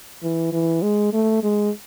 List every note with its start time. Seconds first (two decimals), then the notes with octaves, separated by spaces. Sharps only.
0.23 E3
0.52 E3
0.82 G#3
1.13 A3
1.43 G#3